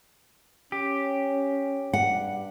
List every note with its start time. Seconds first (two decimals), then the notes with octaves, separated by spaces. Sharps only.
0.72 C#4 G4
1.93 G2 F#5